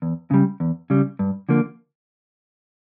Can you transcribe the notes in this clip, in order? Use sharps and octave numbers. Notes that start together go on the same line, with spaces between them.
E2
C#3 G3
E2
C#3 G3
G2
D3 F3 A#3